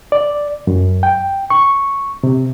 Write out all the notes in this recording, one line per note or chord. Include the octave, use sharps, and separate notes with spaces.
D5
F#2
G5
C#6
C3